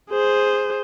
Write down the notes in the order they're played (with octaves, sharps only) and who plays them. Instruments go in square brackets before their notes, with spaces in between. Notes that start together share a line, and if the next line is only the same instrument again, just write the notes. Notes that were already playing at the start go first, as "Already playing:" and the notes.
[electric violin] G#4 C5